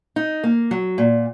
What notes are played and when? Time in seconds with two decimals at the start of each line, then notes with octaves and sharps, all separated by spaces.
0.16 D#4
0.44 A#3
0.71 F#3
0.98 A#2